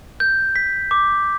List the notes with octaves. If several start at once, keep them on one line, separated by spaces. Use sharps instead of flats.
G6
B6
D6